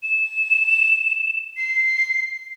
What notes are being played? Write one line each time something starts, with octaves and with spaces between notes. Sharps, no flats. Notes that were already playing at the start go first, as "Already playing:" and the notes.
E7
C7